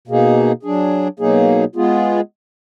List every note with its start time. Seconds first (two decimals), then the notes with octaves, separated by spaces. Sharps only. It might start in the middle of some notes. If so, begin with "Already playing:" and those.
0.07 B2 A#3 D#4 G#4
0.63 F#3 D4 G#4
1.19 B2 F#3 A#3 D#4 G#4
1.75 G#3 B3 F4 G#4